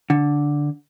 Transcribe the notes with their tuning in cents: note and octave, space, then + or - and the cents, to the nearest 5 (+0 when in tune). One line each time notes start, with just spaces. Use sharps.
D3 -5